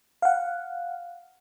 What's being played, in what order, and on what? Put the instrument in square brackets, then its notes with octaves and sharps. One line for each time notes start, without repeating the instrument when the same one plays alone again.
[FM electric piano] F5 F#5